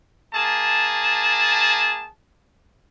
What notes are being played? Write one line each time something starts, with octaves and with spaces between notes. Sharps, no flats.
A#3 G#4 A5